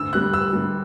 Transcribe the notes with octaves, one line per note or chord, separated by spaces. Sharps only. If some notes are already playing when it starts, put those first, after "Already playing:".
Already playing: D2 E6
D3 G3 F#6
D2 E6
D3 G3